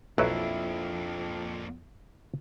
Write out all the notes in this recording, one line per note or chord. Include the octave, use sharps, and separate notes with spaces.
B1 F2 F#3 A#3 D4 E4